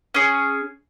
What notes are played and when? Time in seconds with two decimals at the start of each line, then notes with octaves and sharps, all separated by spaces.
0.14 C#4 G#4